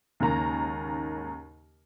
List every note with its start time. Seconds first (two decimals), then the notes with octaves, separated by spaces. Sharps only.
0.20 D#2 G#2 C#3 A#3 G#5 A#5